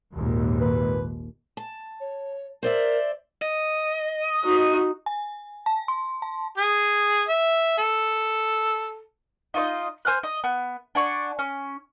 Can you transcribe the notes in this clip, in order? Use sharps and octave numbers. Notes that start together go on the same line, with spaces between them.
G#1 D#2 A#2
B4
A5
C#5
A#4 C5 D5 E5
D#5
D#4 F#4
G#5
A5
C6
A5
G#4
E5
A4
D#4 F4 C#5 D#5
C5 G#5 F6 F#6
D#5
B3
D4 F#5 G#5 C#6
C#4